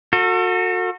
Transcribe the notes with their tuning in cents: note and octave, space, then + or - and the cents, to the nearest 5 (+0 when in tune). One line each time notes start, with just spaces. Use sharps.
F#4 -25 A4 +35